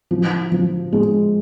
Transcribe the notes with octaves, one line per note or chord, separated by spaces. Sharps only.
F3
F3
G#3